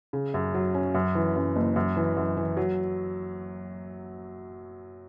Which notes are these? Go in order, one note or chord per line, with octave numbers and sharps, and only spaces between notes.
C#3
F#2
F#3
C#4
F#2
E3
F#2
F#1
F#2
E3
F#2
E3
F#3